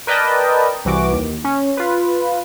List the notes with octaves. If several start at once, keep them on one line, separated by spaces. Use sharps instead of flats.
A#4 B4 D5 D#5 G5 A5
C2 E3 F#4 D6
D#2
C#4
F4 B4